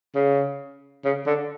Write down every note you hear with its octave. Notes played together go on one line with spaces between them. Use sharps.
C#3
C#3
D3